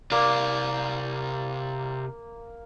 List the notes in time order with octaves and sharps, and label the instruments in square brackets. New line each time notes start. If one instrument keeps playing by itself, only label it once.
[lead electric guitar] C3 D5 [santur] A#3